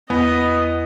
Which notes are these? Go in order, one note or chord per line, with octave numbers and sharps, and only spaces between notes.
E2 B3 D#5